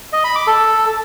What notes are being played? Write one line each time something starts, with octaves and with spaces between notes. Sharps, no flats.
D#5
B5
D6
A4